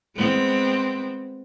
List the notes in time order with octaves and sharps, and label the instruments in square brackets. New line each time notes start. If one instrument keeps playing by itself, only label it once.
[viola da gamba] G#3 B3 C4